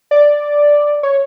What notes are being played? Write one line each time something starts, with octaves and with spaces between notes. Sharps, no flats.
D5
C#5